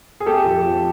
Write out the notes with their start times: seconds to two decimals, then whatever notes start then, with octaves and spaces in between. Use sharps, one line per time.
0.20 G#4
0.26 A3 G4 A4
0.46 F2
0.66 F3